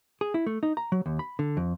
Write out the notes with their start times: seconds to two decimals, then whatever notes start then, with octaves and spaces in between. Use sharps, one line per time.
0.21 G#4
0.34 E4
0.46 A3
0.63 D#4
0.77 A#5
0.92 F#3
1.06 D#2
1.19 B5
1.39 D3
1.57 F2